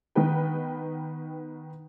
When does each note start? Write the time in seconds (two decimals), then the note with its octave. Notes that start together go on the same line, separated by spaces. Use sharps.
0.15 D#3 B3 B4 G5